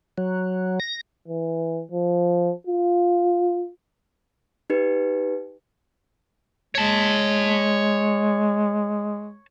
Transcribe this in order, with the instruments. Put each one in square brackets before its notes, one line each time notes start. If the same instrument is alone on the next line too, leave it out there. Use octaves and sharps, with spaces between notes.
[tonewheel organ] F#3
A#6
[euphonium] E3
F3
F4
[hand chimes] D#4 G4 B4
[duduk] G#3 [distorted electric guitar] C#5 A5